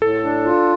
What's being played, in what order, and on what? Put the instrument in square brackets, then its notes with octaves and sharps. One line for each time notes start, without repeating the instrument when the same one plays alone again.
[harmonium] A2 [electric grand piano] A4
[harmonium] D4
F4